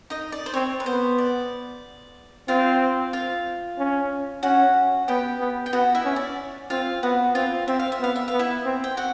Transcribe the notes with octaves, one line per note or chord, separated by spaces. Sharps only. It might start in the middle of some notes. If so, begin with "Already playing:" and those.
D#4 D#5
D5
C5
C4 C#5
B4
B3 C5
D5
C4 F4 F5
F4 F5
C#4
C#4 F#4 F#5
B3 G4 G5
B3
G5
B3 F#4 F#5
E4 E5
C#4
D5
C4 F4 F5
B3 F#4 F#5
C4 F4 F5
C4 E5
F5
E5
B3 F5
E5
B3 F5
E4 E5
C4
G5
F#4 F#5